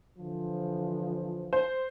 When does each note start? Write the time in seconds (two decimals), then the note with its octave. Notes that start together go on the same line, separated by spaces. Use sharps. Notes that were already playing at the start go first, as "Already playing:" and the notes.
0.19 D3 E3 F3
1.53 C5